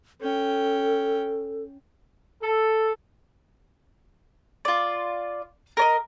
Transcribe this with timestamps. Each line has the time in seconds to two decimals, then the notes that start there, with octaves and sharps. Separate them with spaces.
0.21 C#4 A4 G5
2.41 A4
4.65 F4 D5
5.77 A#4 D5 D#5